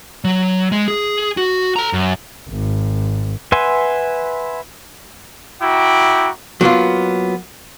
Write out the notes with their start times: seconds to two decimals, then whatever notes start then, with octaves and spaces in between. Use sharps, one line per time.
0.24 F#3
0.72 G#3
0.88 G#4
1.37 F#4
1.76 A4 A#5
1.93 F#2
2.49 G#1
3.52 B4 E5 F#5 G#5 C6
5.60 E4 F#4 G5 A#5 D6
6.61 F#3 A#3 B3 F4